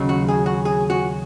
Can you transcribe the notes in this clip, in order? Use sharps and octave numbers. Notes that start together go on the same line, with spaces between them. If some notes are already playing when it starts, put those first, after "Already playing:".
Already playing: D#2 C#3 F#3
F#4
G#4
F#4
G#4
F#4